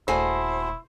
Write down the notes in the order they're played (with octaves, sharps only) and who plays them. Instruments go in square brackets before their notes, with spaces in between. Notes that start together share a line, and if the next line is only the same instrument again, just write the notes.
[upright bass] D#1 A3 [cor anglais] E4 [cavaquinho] F#4 G#4 A4 [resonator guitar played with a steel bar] C5